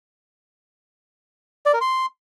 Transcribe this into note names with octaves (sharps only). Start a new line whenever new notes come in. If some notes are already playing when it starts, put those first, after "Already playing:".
D5
A#4
C6